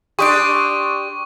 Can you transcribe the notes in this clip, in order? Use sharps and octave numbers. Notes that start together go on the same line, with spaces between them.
D4 G4 C6 C#6 D#6 D7